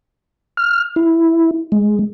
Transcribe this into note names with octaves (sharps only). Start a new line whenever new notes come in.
F6
E4
G#3